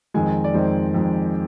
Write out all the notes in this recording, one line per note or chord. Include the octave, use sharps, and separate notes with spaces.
F2 D#3 G#3 G#5
D5
F2 D#3 G#3 C5
F2 D#3 G#3